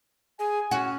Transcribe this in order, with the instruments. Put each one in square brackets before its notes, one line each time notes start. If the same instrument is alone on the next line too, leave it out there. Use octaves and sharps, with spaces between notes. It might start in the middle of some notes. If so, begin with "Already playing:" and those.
[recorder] G#4 [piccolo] G#5
[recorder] C#4 [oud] F#4